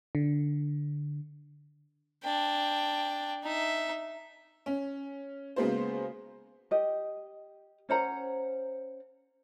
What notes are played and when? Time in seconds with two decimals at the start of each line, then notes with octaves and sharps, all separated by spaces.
0.15 D3
2.23 D4 G5
3.43 D#4 E5
4.66 C#4
5.56 C#3 G#3 A#3 B3 F#4 C5
6.71 G4 D#5
7.89 C#4 C5 F#5 A#5